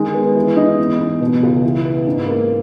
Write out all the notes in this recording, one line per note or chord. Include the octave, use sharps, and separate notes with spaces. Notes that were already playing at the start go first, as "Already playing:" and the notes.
Already playing: D#3 G#3
B3
E3
D#4
E2
E2
B2
C#2
E3
B3
G#2
A#3